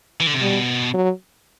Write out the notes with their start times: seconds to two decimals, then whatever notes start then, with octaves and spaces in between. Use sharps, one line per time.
0.20 E3
0.27 D3
0.34 C3
0.41 B2 G3
0.94 F#3